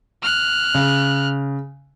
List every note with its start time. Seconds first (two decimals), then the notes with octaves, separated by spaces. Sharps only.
0.23 F6 F#6
0.75 C#3